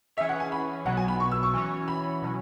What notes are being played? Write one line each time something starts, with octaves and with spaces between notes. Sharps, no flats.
E3 C#4 G#4 C#5 E5
F#5
G#5
B5
B1 B2 F#3 B3 F#5
G#5
B5
C#6
E6
C#6
E3 C#4 F#4 C#5
B5
B2 F#3 C#4